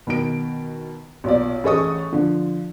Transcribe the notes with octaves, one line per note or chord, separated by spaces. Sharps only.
B2 D#3 D7
B1 A#2 D5
A1 G#4 A4 D#5 C#6 D#6
D3 F3